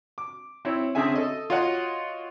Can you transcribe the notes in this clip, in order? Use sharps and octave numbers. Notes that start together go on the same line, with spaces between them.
D6
C4 E4 C#5
D3 C4 C#4 G#4 E5 G#5
A4 D#5
F4 F#4 C#5 D#5 F#5